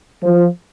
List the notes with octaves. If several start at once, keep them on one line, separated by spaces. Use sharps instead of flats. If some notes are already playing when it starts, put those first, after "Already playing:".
F3